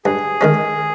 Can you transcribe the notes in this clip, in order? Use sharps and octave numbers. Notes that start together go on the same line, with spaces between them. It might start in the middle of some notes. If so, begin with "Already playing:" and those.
G2 G#4
D#3 G#3 C#4